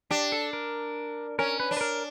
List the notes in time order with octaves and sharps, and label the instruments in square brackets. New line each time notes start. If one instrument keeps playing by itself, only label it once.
[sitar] D4 [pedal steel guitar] G4
[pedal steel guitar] A4
A#4
[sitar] C#4 [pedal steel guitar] A#4
[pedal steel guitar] B4
[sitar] D4
[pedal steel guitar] B4
A#4